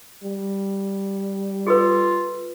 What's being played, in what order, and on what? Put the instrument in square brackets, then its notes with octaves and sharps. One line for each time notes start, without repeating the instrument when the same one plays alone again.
[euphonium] G3
[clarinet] F4 [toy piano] G#4 A4 B4